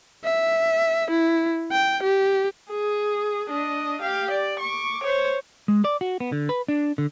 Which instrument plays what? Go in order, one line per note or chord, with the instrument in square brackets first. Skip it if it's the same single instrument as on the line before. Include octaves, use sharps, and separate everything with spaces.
[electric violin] E5
E4
G5
G4
[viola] G#4
D4 D#5
G4 F5
D5
C#6 D6
C5 C#5
[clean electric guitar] G#3
D5
F#4
B3
D3
B4
D4
D3